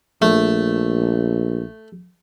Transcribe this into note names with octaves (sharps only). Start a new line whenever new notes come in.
A#1 A3